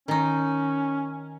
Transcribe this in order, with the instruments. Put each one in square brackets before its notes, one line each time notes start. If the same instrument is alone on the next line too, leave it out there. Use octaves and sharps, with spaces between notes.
[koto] D#3 D#4 [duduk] C#4